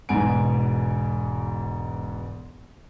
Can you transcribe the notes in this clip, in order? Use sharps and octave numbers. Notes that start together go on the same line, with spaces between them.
E1 G#2 B2 F#5 G#5 D7